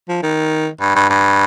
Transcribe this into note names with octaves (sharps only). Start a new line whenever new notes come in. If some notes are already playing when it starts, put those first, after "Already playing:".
F3
D#3
G2
G2
G2